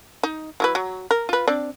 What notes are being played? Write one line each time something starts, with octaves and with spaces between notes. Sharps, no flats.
D#4
F#3 E4 B4
F#3
A#4
F4 B4
C4 D4 D5